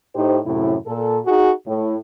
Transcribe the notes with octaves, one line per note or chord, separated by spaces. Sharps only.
A2 D#4 G4 C5
F#2 A2 C3 E4
A#2 A4
D#4 F#4 G#4
A2